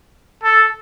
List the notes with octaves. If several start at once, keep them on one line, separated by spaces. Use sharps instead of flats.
A4